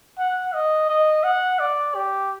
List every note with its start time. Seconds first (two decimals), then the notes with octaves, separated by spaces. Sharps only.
0.19 F#5
0.54 D#5
0.89 D#5
1.23 F#5
1.59 D5
1.95 G4